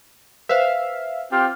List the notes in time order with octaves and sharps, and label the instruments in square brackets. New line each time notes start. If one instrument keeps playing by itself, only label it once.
[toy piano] B4 C5 [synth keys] E5 F5
[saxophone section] C4 F4 G4